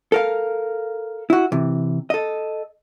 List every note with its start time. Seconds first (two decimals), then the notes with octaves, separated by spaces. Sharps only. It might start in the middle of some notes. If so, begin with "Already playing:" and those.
0.12 A4 A#4 F5
1.30 E4 F#4
1.52 C3 E3
2.10 A4 D#5